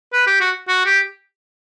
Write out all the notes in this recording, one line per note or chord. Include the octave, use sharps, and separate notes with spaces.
B4
G4
F#4
F#4
G4